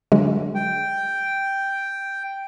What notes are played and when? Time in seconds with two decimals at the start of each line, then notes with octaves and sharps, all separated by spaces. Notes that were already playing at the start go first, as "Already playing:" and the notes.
0.12 D3 F#3 G#3
0.55 G5